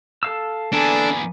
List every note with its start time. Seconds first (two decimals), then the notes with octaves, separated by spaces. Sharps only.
0.23 A4 F5 E6
0.73 E2 D3 A#3 B3 D4 A4 G#5